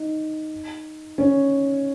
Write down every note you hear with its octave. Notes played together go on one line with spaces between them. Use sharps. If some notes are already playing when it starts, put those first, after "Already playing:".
Already playing: D#4
C#4